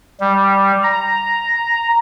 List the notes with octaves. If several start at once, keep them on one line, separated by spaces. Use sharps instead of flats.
G3
A#5